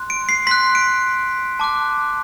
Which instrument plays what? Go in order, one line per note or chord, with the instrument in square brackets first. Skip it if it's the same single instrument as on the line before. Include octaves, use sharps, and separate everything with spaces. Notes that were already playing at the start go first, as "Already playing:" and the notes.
Already playing: [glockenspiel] C6 F#6
D7
C7
C6 F#6 B6
D7
A5 D6 F#6